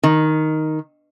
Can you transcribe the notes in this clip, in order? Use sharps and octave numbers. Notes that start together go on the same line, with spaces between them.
D#3